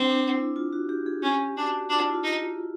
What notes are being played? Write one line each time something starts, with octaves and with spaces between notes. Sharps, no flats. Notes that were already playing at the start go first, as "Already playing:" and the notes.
Already playing: C4 D4
D4
E4
F4
F#4
G4
G#4
C#4 G4
D4 F#4
D4 F4
E4
F4
D#4